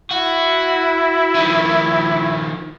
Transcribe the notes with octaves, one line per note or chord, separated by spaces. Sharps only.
E4 F#4
D#3 F3